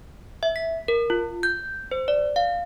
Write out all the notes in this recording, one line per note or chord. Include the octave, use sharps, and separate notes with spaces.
E5
B6
A#4
F4
G6
C5
D5
F5